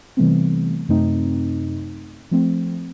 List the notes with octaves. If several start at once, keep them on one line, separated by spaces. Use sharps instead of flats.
C3 E3 G3 A3 B3 C4
F#2 C3 A3 C4 D#4
F3 A3 C4